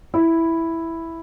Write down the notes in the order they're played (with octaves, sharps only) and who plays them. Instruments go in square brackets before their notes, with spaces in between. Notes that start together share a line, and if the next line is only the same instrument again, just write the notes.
[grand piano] E4